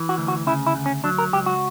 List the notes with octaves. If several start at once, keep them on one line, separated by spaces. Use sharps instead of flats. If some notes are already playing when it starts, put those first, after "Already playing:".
Already playing: E3
F#4
D2
F#4
C#3 E4
E4
D2
C#4
F#3 D4
A#4
C#2 G4
F#4